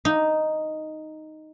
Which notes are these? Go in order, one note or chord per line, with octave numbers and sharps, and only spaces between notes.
D#4